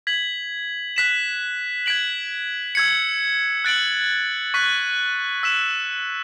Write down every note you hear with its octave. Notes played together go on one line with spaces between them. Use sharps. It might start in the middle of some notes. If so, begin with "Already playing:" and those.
G#6 B6 F#7
F#6 B6 E7
G#6 B6 D7 F#7
E6 G#6 C#7
F#6 A6 D7 F#7
C#6 F#6 B6
E6 B6 E7